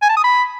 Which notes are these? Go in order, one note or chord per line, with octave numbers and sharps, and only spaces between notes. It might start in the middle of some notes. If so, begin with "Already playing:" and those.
G#5
A5
D#6
B5